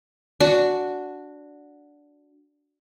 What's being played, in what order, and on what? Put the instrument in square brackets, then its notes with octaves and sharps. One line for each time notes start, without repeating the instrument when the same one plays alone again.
[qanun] D4 F#4